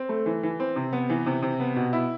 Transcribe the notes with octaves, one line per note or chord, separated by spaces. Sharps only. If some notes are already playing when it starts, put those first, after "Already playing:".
Already playing: C4
A3
E3
E3
C4
C3
B3
E3
C3
C3
B3
B2
E4